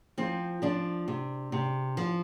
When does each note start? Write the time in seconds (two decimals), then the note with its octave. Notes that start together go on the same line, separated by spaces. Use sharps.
0.18 F3 C4
0.62 F3 D4
1.08 C3
1.52 C3
1.97 F3